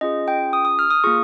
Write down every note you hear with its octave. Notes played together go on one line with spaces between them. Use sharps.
C#4 F4 G#4 D#5
G5
D#6
D#6
F6
D#6
A#3 F4 G#4 C#6